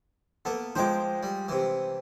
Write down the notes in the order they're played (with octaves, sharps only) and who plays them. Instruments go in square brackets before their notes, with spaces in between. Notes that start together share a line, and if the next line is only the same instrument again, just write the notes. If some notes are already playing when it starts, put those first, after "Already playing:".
[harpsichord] A#3 B3 [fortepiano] A4
[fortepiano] F3 G#3 [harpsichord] C5 G5 D6
[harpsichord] G3
C3 E3